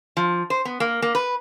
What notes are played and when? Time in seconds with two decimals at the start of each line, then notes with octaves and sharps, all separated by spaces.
0.17 F3
0.50 C5
0.65 B3
0.80 A#3
1.02 A#3
1.15 B4